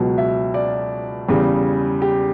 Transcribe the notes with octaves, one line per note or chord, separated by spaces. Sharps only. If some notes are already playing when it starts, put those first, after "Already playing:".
Already playing: C#2 B2 F#3 F#4
E5
D5
E2 C#3 G3
G4